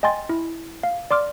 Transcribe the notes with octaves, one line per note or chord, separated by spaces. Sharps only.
D#5 G5 G#5 C6 A6
E4
F5
D5 C6 D6 F6